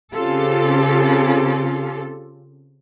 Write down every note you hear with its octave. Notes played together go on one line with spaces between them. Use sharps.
C#3 C4 F4 G4 A4